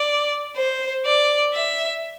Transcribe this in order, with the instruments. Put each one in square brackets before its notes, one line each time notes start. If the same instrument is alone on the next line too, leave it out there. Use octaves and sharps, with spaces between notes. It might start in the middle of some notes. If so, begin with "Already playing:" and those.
Already playing: [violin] D5
C5
D5
E5